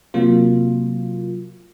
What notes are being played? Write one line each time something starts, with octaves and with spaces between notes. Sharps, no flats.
C3 F#3 A#3 F4